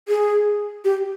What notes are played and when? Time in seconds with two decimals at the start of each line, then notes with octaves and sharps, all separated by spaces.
0.08 G#4
0.85 G4